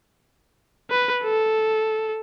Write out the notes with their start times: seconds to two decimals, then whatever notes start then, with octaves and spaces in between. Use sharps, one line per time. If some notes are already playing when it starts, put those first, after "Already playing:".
0.91 B4
1.24 A4